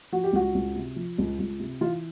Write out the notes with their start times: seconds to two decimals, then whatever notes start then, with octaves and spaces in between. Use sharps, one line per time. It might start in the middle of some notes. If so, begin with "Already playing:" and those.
0.12 F3 F#4
0.24 G4
0.33 C#2 F#4
0.55 C#2
0.76 C3
0.96 F3
1.18 C#2
1.39 C#2
1.60 C3
1.81 E3 F4